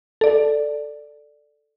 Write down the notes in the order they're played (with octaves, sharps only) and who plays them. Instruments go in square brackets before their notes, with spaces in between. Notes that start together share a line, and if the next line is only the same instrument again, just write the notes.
[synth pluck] A4 D5